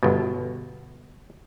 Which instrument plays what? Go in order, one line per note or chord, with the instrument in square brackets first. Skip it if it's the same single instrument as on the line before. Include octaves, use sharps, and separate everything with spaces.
[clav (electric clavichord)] G1 B2